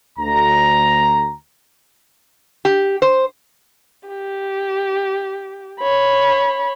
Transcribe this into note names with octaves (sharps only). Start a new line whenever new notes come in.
D2 A#5
G4
C5
G4
C#5 B5